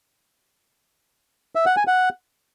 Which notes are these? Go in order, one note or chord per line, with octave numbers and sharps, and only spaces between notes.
E5
F#5
G#5
F#5